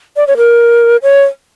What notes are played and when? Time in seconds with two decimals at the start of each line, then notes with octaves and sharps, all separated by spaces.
0.17 D5
0.27 C#5
0.37 A#4
1.03 C#5